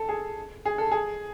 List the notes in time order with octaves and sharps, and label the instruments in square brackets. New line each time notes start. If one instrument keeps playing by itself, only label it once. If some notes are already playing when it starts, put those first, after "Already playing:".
Already playing: [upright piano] A4
G#4
G#4
A4
G#4